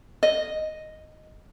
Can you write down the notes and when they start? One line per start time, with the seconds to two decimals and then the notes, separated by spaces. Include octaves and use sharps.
0.23 D#5